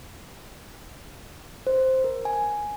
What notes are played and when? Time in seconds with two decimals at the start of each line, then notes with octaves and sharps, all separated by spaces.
1.67 C5
2.04 A#4
2.25 G#5